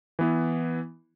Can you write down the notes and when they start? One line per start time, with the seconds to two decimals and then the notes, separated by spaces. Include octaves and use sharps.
0.19 E3 B3 E4